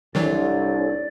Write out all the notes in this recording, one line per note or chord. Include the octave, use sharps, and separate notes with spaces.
C2 D#3 E3 F#3 D4 A4 C#5 D5